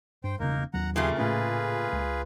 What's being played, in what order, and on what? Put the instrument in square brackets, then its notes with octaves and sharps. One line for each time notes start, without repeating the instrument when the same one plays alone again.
[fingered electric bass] G2 [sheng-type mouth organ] C5 G5
[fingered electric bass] E1 C#3 [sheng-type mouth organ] A#3 D#4 A#4
[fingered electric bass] D#2 F#3 [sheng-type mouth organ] F#5 A#5
[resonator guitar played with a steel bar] A#2 C#3 A3 [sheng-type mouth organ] G4 G#4 C6
[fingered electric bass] A2 C#4 [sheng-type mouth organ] F4 G#4 B4
[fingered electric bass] C#2